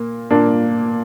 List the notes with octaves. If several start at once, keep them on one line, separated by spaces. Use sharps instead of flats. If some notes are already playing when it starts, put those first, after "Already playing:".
Already playing: A#2 A#3
A#2 A#3 D4